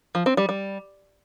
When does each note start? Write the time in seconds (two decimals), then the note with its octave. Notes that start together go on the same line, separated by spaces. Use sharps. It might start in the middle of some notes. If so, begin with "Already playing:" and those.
0.15 F3
0.26 C4
0.37 G3
0.49 G3